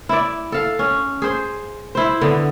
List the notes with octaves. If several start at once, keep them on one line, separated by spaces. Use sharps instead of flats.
E4 D5
A4 F5
C#4
G#4 C5
E4 C5
D3 B3